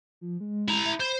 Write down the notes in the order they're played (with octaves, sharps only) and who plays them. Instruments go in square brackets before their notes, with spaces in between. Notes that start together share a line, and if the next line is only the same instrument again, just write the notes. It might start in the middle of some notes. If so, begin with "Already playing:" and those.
[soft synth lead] F3
G#3
[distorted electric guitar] E4 A#5
[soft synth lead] E5
[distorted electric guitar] C5 [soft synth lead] B5